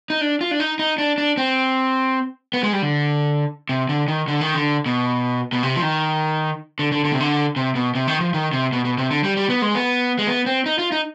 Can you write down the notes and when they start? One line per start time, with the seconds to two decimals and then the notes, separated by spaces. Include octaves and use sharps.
0.10 D#4
0.21 D4
0.41 F4
0.51 D4
0.60 D#4
0.79 D#4
0.98 D4
1.18 D4
1.37 C4
2.54 B3
2.63 G#3
2.73 G3
2.82 D3
3.69 C3
3.89 D3
4.08 D#3
4.28 D3
4.41 D#3
4.55 D3
4.86 B2
5.53 B2
5.63 C3
5.76 F3
5.82 D#3
6.79 D3
6.92 D3
7.05 D3
7.13 C3
7.20 D3
7.56 C3
7.75 B2
7.95 C3
8.08 D#3
8.21 F3
8.34 D#3
8.53 C3
8.73 B2
8.85 B2
8.98 C3
9.11 D3
9.24 G3
9.37 G3
9.50 B3
9.62 G#3
9.75 B3
10.19 G#3
10.27 B3
10.46 C4
10.66 D#4
10.79 F4
10.92 D#4